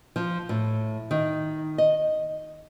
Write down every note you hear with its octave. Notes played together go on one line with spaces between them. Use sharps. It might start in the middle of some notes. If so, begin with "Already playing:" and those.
F3
A2
D#3
D#5